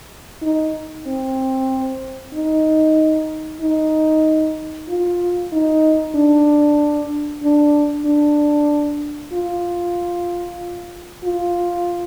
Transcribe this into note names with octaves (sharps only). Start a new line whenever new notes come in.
D#4
C4
D#4
D#4
F4
D#4
D4
D4
D4
F4
F4